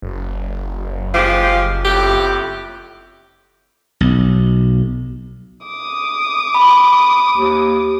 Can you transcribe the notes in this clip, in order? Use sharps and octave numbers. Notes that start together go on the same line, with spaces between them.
F#1
F3 G#3 G4
F2 A2 G4
B1
D6 D#6
B5
D#2